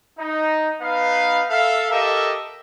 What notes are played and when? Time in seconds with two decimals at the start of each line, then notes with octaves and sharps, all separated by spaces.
0.18 D#4
0.81 B3 D#4 B4 F5
1.49 A4 E5 F5
1.91 G4 A4 A#4 D#5 E5